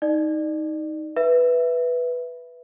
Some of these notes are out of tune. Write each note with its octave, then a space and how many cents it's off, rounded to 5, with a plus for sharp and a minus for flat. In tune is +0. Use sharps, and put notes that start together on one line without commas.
D#4 +10 D5 +30
B4 +0 E5 +0